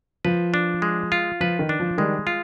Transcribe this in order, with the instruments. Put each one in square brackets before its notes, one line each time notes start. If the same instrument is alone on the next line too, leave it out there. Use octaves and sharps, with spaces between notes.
[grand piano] F3 [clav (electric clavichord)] B4
[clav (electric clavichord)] D4
G#3
F4
[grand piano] F3 [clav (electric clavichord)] B4
[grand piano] D#3
[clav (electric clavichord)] D4
[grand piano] F3
[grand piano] D#3 G3 [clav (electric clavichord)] G#3
[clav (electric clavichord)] F4